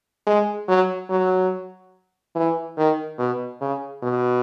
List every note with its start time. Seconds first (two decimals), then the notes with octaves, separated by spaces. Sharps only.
0.27 G#3
0.68 F#3
1.10 F#3
2.35 E3
2.78 D#3
3.19 B2
3.61 C#3
4.02 B2